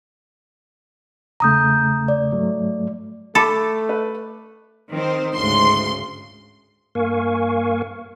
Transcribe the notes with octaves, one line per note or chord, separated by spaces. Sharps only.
E2 C#3 A3 A#5 D#6 G6
D5
G#2 F#3 A3
A3 A4 B5 D6
B4
D#3 C4 C5
G#1 D2 G#2 C#3 C6
G2 A#3 A#4 F5 G#5 C#6